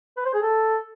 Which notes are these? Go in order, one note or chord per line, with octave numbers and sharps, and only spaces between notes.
B4
C5
G#4
A4